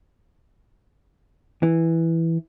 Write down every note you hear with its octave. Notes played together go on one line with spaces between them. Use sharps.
E3